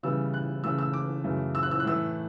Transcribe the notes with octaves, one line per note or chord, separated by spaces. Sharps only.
C#3 E3 G3 B3 E6
F#6
C#3 E3 A3 E6
E6
D6
F#2 C#3 E3 A3
E6
F#6
E6
F#6
A2 E3 A3 E6